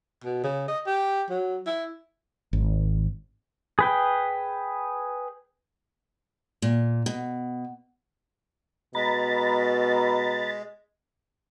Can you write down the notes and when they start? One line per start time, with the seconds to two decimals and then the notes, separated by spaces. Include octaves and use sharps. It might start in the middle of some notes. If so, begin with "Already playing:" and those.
0.24 B2
0.44 C#3
0.68 D#5
0.86 G4
1.30 F#3
1.66 E4
2.53 G#1
3.79 G#4 B4 G5
6.62 A#2
7.06 B2
8.95 B2 G#3 A#5 B5 A6